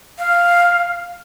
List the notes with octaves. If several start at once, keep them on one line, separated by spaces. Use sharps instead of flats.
F5